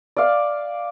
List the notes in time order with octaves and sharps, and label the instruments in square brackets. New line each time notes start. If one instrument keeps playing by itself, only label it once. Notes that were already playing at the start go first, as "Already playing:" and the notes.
[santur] D5 F5